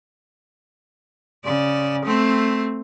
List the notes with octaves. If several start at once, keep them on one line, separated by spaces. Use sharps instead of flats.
C#3 D5
A3 C4